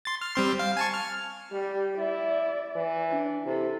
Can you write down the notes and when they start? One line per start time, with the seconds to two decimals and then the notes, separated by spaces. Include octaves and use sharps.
0.05 C6 A6
0.21 F6
0.35 G3 C4 C6
0.59 F5
0.77 G#5 A5 C#6
0.94 F6
1.52 G3 G4
1.98 E4 D5 E5
2.76 E3
3.09 D4
3.46 C3 E4 A4